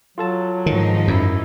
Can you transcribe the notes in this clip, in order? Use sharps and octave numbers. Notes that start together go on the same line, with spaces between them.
F#3 F4 A4 A5
G#2 D#3 F3 D#4
F#2 E4